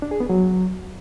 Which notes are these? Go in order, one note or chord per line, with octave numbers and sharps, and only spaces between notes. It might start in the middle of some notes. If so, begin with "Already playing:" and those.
D4
G#4
B3
F#3